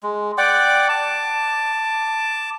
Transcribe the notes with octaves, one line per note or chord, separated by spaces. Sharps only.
G#3
D5 F#5 G5 D6
A5 D6